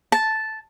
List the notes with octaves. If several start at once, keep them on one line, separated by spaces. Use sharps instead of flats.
A5